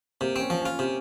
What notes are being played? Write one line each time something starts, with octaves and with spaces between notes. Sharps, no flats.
C3 A#3
C4 C#4
F3
C#4
F4
C3 C4